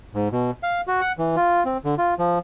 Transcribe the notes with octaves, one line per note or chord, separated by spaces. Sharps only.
G#2
B2
F5
F#4
F#5
E3
F4
C4
D3
F4
F3